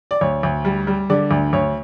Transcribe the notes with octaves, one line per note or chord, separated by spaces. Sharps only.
D5
D2 C#5
D2
G3
G3
D3 D5
D2
D2 C#5